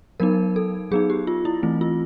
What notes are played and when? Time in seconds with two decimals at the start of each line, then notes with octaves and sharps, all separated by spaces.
0.20 F#3 B3 D#4 A#4
0.56 A4
0.91 F#3 B3 D#4 G#4
1.10 G4
1.27 F4
1.45 E4
1.63 E3 A3 C4
1.81 F4